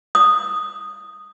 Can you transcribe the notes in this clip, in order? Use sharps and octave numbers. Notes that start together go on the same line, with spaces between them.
D#6